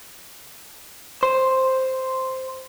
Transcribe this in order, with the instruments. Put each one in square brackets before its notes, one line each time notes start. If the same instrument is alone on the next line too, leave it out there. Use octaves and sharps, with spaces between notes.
[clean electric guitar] C5